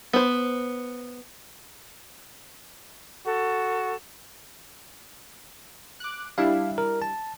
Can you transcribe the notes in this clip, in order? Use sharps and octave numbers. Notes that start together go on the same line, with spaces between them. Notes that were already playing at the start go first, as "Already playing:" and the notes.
B3 C5
F#4 A4
D6 F#6
G3 D4 E4 F5
A#4
A5